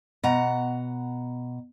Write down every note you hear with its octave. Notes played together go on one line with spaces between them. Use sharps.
B2 F#5 A#5